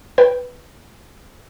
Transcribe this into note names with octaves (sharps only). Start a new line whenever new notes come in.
B4 G5